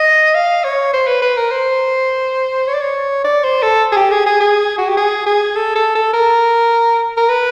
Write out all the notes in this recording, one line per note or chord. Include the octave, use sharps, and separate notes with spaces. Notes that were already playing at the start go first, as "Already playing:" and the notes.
Already playing: D#5
F5
C#5
C5
B4
B4
A#4
C5
C#5
D5
C#5
D5
C5
A4
G#4
G4
G#4
G#4
G#4
F#4
G4
G#4
G#4
A4
A4
A4
A#4
A#4
B4